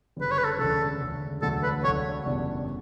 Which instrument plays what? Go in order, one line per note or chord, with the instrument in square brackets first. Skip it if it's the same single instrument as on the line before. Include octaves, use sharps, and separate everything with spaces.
[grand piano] G1 F#2 C#3 G3 [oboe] B4
[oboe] C#5
B4
A4
[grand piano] E1 D2 C#3 [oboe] A4
[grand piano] E1 D2 C#3
[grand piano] E1 D2 D3 F#3 A3 [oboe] A4
[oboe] B4
[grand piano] E1 D2 D3 F#3 A3 [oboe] C#5
[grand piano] F#1 E2 B2 G3 D4